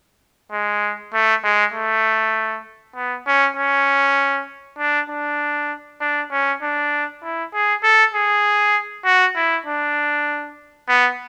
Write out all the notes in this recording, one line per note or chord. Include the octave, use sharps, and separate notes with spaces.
G#3
A3
G#3
A3
B3
C#4
C#4
D4
D4
D4
C#4
D4
E4
G#4
A4
G#4
F#4
E4
D4
B3